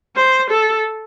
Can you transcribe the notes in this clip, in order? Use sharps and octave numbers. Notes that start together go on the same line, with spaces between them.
C5
A4